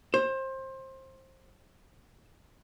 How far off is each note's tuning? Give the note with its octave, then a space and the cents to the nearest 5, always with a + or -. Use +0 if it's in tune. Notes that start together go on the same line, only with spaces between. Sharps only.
C5 +25